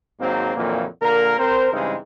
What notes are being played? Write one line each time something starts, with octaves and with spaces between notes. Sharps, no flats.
G#1 G#2 F#3 A#3 C4
F2 A#2 D3 E3 F#3 A#3
A#2 D3 A#3 A#4
C4 A#4 C5
G2 C#3 E3 G#3 C4 D#4